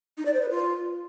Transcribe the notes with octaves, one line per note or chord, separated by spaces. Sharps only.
D#4
D5
C5
B4
F4